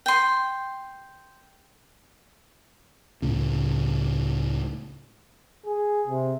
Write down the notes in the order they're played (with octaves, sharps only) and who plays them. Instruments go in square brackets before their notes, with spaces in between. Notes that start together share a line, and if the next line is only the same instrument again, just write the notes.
[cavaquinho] G5 C6
[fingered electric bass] C#2 A2 C#3
[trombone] G#4
C3